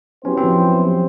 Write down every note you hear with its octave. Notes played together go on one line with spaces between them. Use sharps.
F#3 B3 C#4 E4 G4 C5
C4
F3